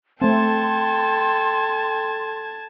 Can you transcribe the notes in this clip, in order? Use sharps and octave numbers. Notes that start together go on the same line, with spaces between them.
A3 C4 A4 G5 A5 C6 G#6